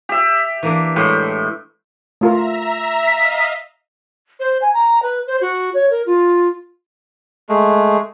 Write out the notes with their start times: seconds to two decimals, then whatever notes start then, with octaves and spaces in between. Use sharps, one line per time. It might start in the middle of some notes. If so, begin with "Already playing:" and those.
0.09 G4 E5
0.63 E3 A#3 D4
0.96 A2 G#3 E5 G5
2.21 A3 F4 A#4 E5 A#5
3.07 D#5 F5 B6
4.39 C5
4.61 G#5
4.73 A#5
5.02 B4
5.27 C5
5.41 F#4
5.74 C#5
5.90 A#4
6.06 F4
7.49 G#3 A3